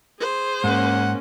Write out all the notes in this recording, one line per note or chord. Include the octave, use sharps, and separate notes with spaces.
G#4 C5
G#2 A#3 C#4 F#5